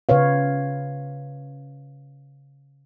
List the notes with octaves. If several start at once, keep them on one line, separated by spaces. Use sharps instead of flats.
C#3 B4 C#5 F5